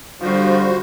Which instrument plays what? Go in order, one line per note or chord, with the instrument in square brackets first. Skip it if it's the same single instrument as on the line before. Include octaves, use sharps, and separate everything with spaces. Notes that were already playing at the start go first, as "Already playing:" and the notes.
[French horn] D3 [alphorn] F3 [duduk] G3 [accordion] F#4 C5